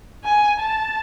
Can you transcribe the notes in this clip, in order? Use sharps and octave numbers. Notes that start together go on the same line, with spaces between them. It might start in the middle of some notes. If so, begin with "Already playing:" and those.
G#5
A5